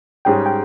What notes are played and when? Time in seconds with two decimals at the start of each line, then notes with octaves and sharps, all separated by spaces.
0.25 G#2 G3 C#4 G#4 G5
0.46 G5